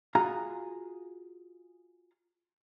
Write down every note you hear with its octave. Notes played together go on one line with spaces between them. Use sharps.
F4 F#4 G#4 F5 A#5